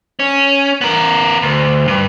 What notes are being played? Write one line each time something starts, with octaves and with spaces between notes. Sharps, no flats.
C#4
B3 A#4
D2
G2